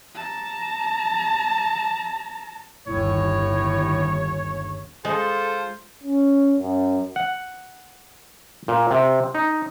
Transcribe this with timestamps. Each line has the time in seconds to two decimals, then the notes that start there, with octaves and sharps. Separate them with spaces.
0.14 A5 A#5
2.87 G1 D#2 A2 C#5
5.05 G#3 F4 A4 C5
6.04 C#4
6.60 F#2
7.16 F#5
8.68 A#2
8.91 C3
9.35 D#4